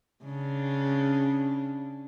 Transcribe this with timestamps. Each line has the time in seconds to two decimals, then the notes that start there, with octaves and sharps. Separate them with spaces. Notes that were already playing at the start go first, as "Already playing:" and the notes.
0.24 C#3 D4